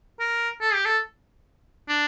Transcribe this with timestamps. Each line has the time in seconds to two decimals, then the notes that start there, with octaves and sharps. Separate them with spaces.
0.20 A#4
0.61 A4
0.74 G4
0.85 A4
1.88 D4